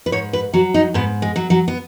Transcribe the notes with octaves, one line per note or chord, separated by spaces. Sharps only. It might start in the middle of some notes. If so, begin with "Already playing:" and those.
B4
G#2 C#5
B4
F#3 F#4
D#4
G#2 B3
G#3
F#3
F#3
B3